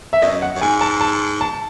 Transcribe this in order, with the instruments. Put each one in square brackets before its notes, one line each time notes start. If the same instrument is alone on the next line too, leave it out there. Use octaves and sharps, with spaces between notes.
[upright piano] E5
[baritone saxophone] F#2 [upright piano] D#5
[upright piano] F#5
[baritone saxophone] F#2
[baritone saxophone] G#2 [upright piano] G#5
[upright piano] A5
A5
A5